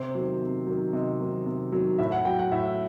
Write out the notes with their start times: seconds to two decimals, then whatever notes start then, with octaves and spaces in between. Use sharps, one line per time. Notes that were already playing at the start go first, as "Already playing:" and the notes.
Already playing: C3 C5
0.15 D#3 F#3
0.42 C3
0.67 D#3 F#3
0.93 C3 D#5
1.20 D#3 F#3
1.46 C3
1.72 D#3 F#3
1.99 A2 E5
2.12 F#5
2.25 F#3 G5
2.39 F#5
2.52 A2 E5